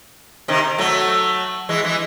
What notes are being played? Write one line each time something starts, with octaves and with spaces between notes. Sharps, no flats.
C3 D#3
F#3 A3
E3 G#3
E3 G#3